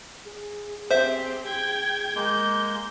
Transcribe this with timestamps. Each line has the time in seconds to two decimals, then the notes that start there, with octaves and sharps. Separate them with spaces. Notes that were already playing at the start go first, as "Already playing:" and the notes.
0.25 G#4
0.91 C4 G4 C5 E5
1.46 G5 G#6
2.16 G#3 A#3 G6